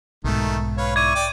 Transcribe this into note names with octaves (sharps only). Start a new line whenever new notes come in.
B1 G#2 D#3 A3
B4 C#5 F5
E4 D5 C#6 G#6 D#7
D5 G5 D6